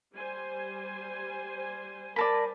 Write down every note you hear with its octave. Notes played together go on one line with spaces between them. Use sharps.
G3 C5 G#5
A#4 D5 A5 B5